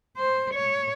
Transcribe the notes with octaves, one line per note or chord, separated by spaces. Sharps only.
C5
C#5